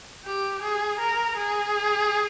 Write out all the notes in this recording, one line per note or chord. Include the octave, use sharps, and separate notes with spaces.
G4
G#4
A#4
G#4